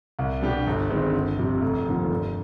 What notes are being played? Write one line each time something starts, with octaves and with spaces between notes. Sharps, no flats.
C2
B2 G3 D4 G4
G1
G2 D#3 G#3 C4
G1
F2 C3 G3
F1
D#2 D3 F3
G2